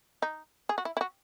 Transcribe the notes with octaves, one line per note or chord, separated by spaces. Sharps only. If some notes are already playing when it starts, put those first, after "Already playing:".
D#4
G#4
F#4
E4
E4
F#4